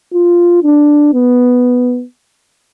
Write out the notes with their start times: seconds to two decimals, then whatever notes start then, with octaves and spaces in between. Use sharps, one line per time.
0.14 F4
0.64 D4
1.13 B3